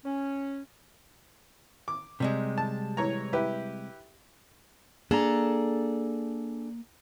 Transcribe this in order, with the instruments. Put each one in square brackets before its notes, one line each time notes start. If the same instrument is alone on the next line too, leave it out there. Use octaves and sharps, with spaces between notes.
[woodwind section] C#4
[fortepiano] D6
[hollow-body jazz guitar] C3 G3 G#3
[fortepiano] A5
E3 C#5 A#5
E4 G4 B4
[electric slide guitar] A#3 A#5 [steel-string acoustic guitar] D4 G#4 A4